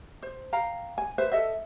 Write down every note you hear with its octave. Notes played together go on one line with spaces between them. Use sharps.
C5
F5 G5 A#5
G#5
B4 C5 E5
A4 D#5 E5